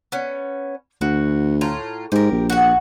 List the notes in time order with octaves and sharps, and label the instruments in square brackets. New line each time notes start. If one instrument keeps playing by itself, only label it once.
[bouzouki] B3 C#4
[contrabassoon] D2 [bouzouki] F#4
[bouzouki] A2 F4 A#5
[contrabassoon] G#2 [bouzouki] G4 A#4
[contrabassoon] A#1
[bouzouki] F#4 F#5